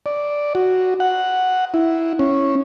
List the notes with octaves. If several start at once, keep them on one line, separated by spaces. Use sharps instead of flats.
D5
F#4
F#5
E4
C#4